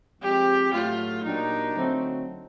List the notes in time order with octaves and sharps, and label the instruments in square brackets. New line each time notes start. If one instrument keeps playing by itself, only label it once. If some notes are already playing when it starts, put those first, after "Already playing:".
[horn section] F3 G#3 C4 [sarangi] G4
[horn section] A2 F#3 A3 [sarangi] F4
[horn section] A#2 F#3 A#3 D4 G4 [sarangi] D#4
[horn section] D3 F#3 A3 C4